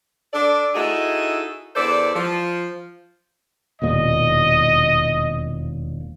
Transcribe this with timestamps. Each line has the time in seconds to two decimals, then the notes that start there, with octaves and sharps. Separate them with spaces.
0.34 D4 A4 D5
0.75 D#4 E4 F#4 G#4 A4 D#5
1.76 E2 A4 B4 C5 D5
2.14 F3
3.82 E1 D#2 A#2 D#5